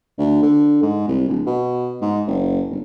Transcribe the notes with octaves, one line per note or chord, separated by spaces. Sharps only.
D2
D3
G#2
C2
D1
B2
G#2
F#1
G1